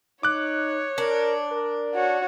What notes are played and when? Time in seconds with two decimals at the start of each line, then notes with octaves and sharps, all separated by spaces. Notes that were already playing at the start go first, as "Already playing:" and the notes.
0.23 D#4 C#5 D6 F#6
0.98 D4 A#4
1.52 A#4
1.94 F#4 C#5